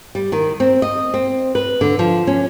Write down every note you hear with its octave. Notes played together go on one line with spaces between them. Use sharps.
G3
D#3
C4
D#5
C4
B4
D3
F3
C#4